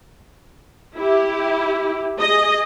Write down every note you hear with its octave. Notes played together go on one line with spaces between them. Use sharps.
E4 G4
G#4 D#5